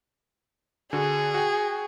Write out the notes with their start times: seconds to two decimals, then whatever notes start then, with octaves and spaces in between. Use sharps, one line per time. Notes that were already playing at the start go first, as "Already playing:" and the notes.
0.93 D3 F#4 G#4
1.34 F#4 G5